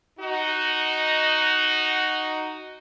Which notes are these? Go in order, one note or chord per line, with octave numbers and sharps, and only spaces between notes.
D#4 F#4